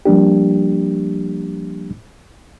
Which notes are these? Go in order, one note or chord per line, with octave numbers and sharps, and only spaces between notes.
F3 G3 A#3 D4 G4